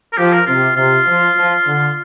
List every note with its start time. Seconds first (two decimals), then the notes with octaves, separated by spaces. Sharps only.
0.13 A#4
0.18 F3 G4
0.33 A#4
0.46 C3 F4
0.76 C3 F4
1.06 F3
1.36 F3
1.66 D3